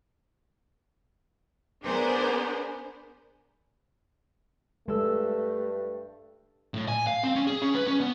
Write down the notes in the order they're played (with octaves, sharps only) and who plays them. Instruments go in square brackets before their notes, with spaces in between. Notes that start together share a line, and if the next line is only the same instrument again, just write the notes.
[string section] B3 D4 G#4 A#4 C5
[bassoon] G2 [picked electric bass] G#3 [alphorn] A3 [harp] A4 E6
[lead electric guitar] A2
G#5
F5
C4
C#4
G#4
C#4
B4
C#4
B3